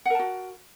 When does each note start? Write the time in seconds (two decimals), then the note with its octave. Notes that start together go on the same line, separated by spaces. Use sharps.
0.05 F#5
0.10 A#4
0.15 A5
0.19 F#4